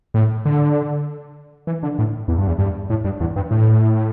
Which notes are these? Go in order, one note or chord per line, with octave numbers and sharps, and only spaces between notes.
A2
D3
E3
D3
A2
E2
G2
E2
G2
A2
G2
E2
G2
A2